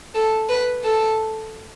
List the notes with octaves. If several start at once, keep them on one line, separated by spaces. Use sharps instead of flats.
A4
B4
A4